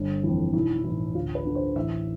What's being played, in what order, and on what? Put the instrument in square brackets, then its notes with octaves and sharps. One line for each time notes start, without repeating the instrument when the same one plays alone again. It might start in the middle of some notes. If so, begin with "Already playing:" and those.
Already playing: [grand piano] G1
F2 E3
B1 E4
A2 E3
D2 F4
B4
D3
C5
A1 E5